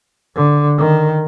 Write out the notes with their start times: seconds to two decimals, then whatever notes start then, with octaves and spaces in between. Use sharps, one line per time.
0.35 D3
0.78 D#3